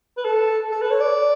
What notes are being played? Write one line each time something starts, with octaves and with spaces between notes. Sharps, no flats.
B4
A4
A4
B4
C#5
D5